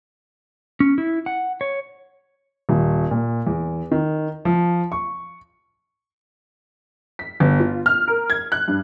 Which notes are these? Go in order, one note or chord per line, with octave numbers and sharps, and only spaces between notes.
C#4
E4
F#5
C#5
D#1
A#2
E2
D#3
F3
C#6
B6
G1
F4
F6
A#4
G#6
F#6
G2